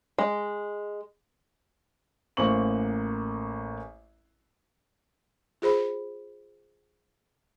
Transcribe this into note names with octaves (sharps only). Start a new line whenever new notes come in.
G#3
A1 A#3 C5 C#6 F#7
F4 G#4 C5 B5